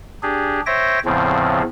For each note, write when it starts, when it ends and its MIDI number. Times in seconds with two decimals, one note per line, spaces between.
0.23 0.61 62
0.23 0.61 67
0.23 0.61 68
0.66 0.99 72
0.66 0.99 73
0.66 0.99 76
0.66 0.99 79
0.66 0.99 94
1.05 1.62 40
1.05 1.62 45
1.05 1.62 49
1.05 1.62 53
1.05 1.62 60